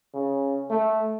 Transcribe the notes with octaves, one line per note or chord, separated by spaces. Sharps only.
C#3
A3